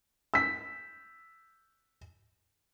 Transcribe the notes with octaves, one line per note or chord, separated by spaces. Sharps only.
E6 B6